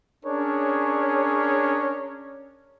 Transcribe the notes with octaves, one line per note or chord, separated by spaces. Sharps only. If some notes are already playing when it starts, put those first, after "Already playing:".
C#4 D4 G#4 A#4 C#5